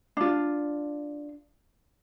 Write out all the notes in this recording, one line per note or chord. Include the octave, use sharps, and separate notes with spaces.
D4 F4